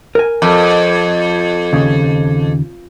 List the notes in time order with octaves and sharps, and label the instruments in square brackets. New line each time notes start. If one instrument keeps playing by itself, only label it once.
[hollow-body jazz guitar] A#4 G#5
[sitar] F2
[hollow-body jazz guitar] D#2 C#3